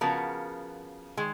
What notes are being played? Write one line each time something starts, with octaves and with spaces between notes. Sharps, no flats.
C#3 F3 B3 F#4 A#4
D#3 G#3